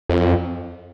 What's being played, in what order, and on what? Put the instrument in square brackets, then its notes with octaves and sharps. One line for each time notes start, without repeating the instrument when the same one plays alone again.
[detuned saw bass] F2